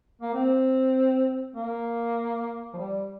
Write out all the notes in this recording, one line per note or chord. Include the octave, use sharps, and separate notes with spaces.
A#3
C4
A#3
F3
G3